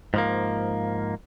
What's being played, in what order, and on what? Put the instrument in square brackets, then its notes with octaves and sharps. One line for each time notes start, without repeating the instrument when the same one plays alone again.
[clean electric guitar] G#2 F3 A#3